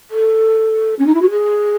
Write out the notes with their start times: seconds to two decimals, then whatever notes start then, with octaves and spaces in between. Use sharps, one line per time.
0.10 A4
0.99 C#4
1.06 D#4
1.14 E4
1.21 F#4
1.30 G#4